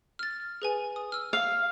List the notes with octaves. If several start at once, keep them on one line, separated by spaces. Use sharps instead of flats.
F6 A6
G#4 B4 G#5
D#6
E6 F6
F5 F7